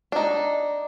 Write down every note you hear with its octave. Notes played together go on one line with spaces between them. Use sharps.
D4 D#4